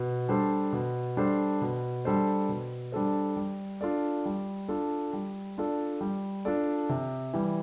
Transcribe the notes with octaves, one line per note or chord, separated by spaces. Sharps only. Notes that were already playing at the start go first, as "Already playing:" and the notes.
Already playing: B2
G3 D4 A4 C5
B2
G3 D4 A4 C5
B2
G3 D4 A4 C5
B2
G3 D4 A4 C5
G3
D4 F4 A4 D5
G3
D4 F4 A4 D5
G3
D4 F4 A4 D5
G3
D4 F4 A4 D5
C3
E3 G3